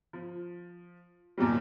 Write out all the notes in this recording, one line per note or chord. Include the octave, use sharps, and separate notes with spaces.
F3
D#2 A#2 F#3 G3